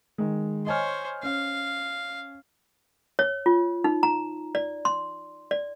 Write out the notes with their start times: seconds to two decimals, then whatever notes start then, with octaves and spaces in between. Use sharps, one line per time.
0.18 D#3 G#3
0.66 C5 C#5 D#5 G#5 F6
1.23 C#4 F5
3.19 C#5
3.46 F4
3.84 D#4
4.03 A#5
4.55 D5
4.85 C6
5.51 D5